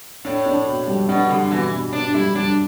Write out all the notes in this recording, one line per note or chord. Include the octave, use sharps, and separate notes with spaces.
A2 D4
D4
B2
G3
B2 D4
D3 G3
B2 E3
B2
B2 D4
G3 E4
G3 D4